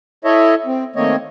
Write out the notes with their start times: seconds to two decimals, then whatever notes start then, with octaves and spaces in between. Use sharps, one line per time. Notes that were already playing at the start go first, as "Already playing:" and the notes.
0.25 E4 A4 C#5 D#5 E5
0.66 C4
0.96 D#3 A3 A#3 C4 C#5 D#5